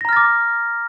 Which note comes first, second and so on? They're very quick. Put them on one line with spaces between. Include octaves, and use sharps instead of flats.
A#6 A#5 F6 A6 D6